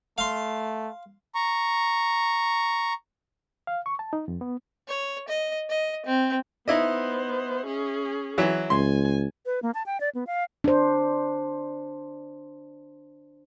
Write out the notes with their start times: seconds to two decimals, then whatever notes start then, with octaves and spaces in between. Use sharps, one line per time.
0.18 A3 F5 C6
1.35 A#5 C#6
3.67 F5
3.86 C#6
3.99 A5
4.13 D#4
4.28 F2
4.41 B3
4.88 C#5
5.28 D#5
5.69 D#5
6.06 C4
6.68 B3 D#4 E4 C5 D#5
7.66 C#4 G#4
8.38 E3 F#3
8.70 C#2 G#5 C6
9.46 B4
9.63 A#3
9.74 A5
9.86 G5
10.00 D5
10.15 B3
10.27 F5
10.64 D4 C5